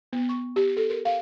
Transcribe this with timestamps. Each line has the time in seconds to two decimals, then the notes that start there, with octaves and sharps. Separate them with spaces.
0.13 B3
0.29 C#6
0.56 G4
0.77 A4
0.90 A#4
1.05 F5